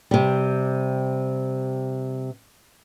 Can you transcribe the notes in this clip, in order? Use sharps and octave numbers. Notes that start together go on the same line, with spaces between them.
C3 G3